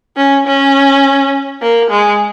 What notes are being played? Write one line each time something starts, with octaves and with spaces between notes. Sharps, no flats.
C#4
C#4
A#3
G#3